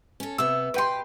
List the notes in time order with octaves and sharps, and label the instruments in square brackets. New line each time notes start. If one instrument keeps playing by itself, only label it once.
[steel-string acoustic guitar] C#4 A4
[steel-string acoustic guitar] C3 B3 [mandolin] E6
[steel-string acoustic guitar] B2 G4 [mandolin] B4 G5 C6